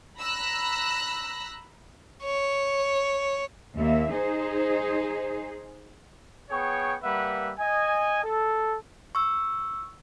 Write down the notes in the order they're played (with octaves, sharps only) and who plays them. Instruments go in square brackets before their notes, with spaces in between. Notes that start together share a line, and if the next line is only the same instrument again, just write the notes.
[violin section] A#5 B5 E6 F#6 A#6
[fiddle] C#5
[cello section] D#2 A#3 E5
D#4 G#4 C5
[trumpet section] B3 G#4 C#5 G5 C#6
G3 A#3 B4 E5 F#5
D#5 G#5
A4
[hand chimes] C#6 E6